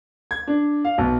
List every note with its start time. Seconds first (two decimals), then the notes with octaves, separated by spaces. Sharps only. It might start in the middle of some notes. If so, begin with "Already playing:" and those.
0.31 G#6
0.47 D4
0.85 F5
0.98 B1